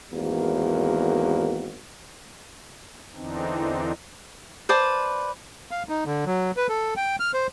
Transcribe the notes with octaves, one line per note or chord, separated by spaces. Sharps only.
G#1 E2 A#3 F#4
E2 D3 E3 C4 D4 D#4
B4 C5 D5 A5
F5
D#4
D3
F#3
B4
A4
G5
F6
C5